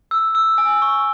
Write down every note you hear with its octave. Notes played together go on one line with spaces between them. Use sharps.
E6
E6
G#5
C#6